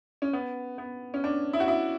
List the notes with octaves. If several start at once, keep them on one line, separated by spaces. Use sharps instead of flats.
C#4
B3
B3
C#4
D4
E4
F#4
E4